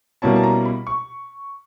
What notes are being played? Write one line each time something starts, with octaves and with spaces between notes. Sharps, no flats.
B2 G3 A#3 C#4 E4 A5
A5
A#5
B5
C#6